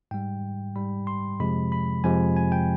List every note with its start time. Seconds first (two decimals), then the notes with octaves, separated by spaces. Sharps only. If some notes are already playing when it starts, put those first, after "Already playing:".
0.11 G#2 G3 G5
0.76 G#2 G3 B5
1.07 C6
1.40 F2 C3 F3 G#3 B5
1.72 B5
2.04 F2 C3 F3 G#3 G#5
2.36 G#5
2.52 G5